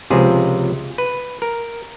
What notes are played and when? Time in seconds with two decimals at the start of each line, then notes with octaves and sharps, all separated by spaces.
0.10 C#2 C3 F3 G#4
0.98 B4
1.42 A#4